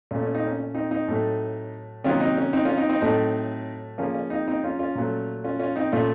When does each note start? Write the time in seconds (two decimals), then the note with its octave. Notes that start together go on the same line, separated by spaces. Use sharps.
0.11 A#2 C#4
0.15 A3
0.22 C#4
0.35 C4 D#4
0.47 C#4
0.59 C#4
0.75 C4 D#4
0.91 C4 D#4
1.08 A2 F#3 A3
2.04 C3 D#3 F#3 A#3 C#4 F4
2.20 C4 D#4
2.37 C#4
2.53 C4 D#4
2.65 C#4 F4
2.77 C4 D#4
2.89 C4 D#4
3.01 A2 F#3 A3 C4 D#4
3.98 C#3 F3 A#3 C#4
4.14 C#4
4.30 C4 D#4
4.47 C4 D#4
4.64 C#4 F4
4.79 C#4 F4
4.95 A#2 F#3 A3
5.44 C#4 F4
5.60 C#4 F4
5.76 C4 D#4
5.92 A#2 A3 C#4 F4